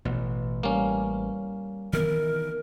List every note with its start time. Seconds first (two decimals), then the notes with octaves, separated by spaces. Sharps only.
0.05 A1 B2
0.63 G3 A#3 C#4
1.93 D#3 E3 B3 A#4